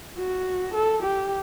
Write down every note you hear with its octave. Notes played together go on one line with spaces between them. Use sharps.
F#4
A4
G4